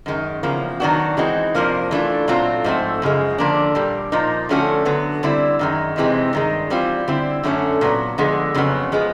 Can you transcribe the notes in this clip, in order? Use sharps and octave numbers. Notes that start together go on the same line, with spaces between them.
F#2 D#3 G#3
E2 C#3 F3 A#3
D#3 F#3 B3 D4 F#4
E3 G#3 C4 D#4 F#4
F2 C3 F3 A#3 D4
E3 A3 D4 F4
A#2 F#3 A3 C4 F4
G#2 F3 A3 C4
F#2 C#3 F3 G#3
D3 F3 A#3 D4
A#2 G3 A#3
A#2 F3 A#3 D#4
D3 F3 A3 C#4 F#4
D3 F#3 B3
D3 G3 C4 E4
F#2 D#3 G#3
F2 C3 E3 G#3 C4
G2 D#3 G#3
E3 G3 C4 F4
D3 G3 C4 E4
F#2 D3 F#3 A3 C#4
A#2 F#3 B3
D3 F3 G#3 B3
F2 C#3 F#3 B3
F3 G#3 B3